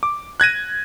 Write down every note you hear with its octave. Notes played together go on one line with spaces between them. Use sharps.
D6
F#6 G#6 A#6 D#7